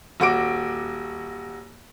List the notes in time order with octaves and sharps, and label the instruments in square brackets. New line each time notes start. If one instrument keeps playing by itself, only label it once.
[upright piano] D#1 F#4 D6 D7